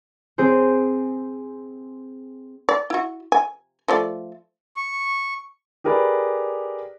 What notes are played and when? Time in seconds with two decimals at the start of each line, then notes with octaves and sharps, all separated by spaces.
0.38 C4 G#4 C5
2.69 D5
2.90 E4 F#4
3.32 G#5
3.88 F3 A3 D5
4.76 C#6
5.84 G4 G#4 A#4 B4 D5